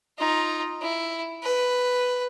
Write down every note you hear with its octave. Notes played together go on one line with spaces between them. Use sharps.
D#4 F4
E4
B4